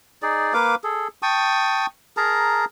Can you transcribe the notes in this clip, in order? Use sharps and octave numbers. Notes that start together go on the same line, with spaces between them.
D#4 G#4 D5
A#3 B4 F5 D6
G#4 A4
G5 A5 C#6 D#6
G#4 A#4 A5 A#5